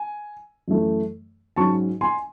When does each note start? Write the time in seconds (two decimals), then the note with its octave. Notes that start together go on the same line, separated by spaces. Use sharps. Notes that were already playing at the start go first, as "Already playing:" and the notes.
Already playing: G#5
0.68 F#2 E3 A3
1.56 G#2 F#3 C#4 A5 C#6
2.01 G#5 C6